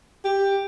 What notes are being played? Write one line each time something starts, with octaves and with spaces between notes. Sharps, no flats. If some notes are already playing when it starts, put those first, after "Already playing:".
G4